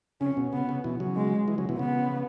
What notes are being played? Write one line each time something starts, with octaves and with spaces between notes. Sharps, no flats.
C#3 C#4
B2
C#3 B3
C#3
B2 E3
C#3 F#3
G#3
E3 G#3
C#3 F#3
B2 E3
C#3 B3